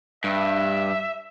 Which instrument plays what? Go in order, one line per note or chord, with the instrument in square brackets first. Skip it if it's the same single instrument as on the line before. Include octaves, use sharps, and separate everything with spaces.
[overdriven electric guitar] G2 [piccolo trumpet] E5